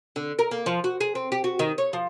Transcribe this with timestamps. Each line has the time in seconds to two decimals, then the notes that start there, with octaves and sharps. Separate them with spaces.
0.16 D3
0.39 A#4
0.51 A#3
0.66 F3
0.84 F#4
1.01 G#4
1.15 C4
1.32 G4
1.44 F#4
1.59 D#3
1.78 C#5
1.93 F3